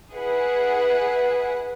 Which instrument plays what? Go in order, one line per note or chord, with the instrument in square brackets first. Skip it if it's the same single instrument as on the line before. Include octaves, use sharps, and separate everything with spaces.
[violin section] E4 G#4 B4 F#5